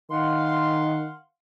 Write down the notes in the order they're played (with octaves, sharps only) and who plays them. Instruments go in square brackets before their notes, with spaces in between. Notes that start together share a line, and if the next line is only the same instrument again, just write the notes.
[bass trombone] D#3 [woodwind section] F5 F#5 C6